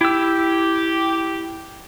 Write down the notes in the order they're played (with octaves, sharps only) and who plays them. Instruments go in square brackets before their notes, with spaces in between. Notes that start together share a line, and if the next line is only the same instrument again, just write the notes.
[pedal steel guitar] E4 E6 [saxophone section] G4